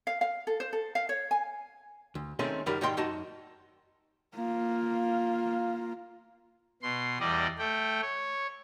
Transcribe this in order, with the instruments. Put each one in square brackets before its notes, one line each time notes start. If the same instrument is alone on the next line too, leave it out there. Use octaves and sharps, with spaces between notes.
[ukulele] F5
F5
A4
C5
A4
F5
C#5
G#5
[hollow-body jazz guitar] D2
D#3 G#3 A3 C4 C#4 G#4
C#2 F#2 D#3 G3 A#4 B5
G#2 D#3 G3 D#5 G5 C6
F#2 F#3 D#4 F#4 D#5 A5
[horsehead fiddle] A#3 F4
[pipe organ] B2 C6
E2 G3 D5 D#5
A3 G5
C#5